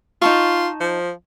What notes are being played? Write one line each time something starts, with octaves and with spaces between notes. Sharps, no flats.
D#4 F4 A5 C#6
F3